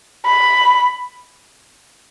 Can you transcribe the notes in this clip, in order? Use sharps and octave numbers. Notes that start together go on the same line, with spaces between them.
B5